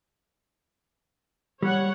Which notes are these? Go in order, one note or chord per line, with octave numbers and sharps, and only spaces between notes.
G3 C#5 F#5